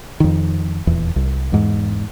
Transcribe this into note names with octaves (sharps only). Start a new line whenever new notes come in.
F2 D#3
D#1 E2
C2
E2 G#2